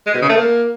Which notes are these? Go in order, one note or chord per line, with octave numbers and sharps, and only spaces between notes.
G#3
B2
C#3
A3
A#3